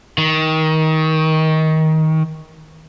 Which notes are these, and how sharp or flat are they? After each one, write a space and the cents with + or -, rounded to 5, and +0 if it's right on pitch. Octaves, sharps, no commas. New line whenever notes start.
D#3 +20